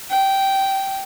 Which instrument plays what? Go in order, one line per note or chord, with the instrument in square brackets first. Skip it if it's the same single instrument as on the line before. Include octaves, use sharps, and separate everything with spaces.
[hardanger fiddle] G5